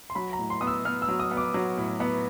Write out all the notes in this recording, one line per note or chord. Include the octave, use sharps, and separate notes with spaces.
C6
F#3 B5
A#5
A2
C6
B3 D#6
E6
B3 F6
E6
F#3
D#6
B3
D6
F#3
A2
B3